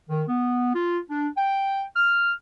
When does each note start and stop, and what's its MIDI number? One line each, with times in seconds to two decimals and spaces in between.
0.10 0.23 51
0.28 0.72 59
0.74 0.99 65
1.10 1.28 62
1.37 1.83 79
1.96 2.32 89